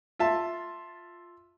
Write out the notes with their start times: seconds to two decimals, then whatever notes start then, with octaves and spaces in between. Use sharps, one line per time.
0.19 F4 E5 A5